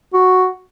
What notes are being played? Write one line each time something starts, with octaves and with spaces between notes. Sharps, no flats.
F#4